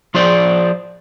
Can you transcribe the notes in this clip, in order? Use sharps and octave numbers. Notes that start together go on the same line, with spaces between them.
F3 F4 G#4 C5 D5